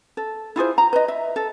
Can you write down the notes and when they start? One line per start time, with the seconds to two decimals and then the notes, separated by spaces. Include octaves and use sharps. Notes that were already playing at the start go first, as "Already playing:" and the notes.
0.17 A4
0.56 E4 F4 G#4 C5
0.78 A#5
0.93 B4 D#5
1.08 E5
1.36 A4